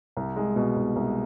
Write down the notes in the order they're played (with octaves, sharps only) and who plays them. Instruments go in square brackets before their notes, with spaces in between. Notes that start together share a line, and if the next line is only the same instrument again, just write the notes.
[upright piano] C2
G#3
B2
C2
C2